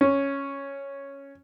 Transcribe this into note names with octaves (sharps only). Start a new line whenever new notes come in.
C#4